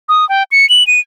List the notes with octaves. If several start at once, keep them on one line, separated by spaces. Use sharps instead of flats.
D#6
G5
C#7
F#7
D#7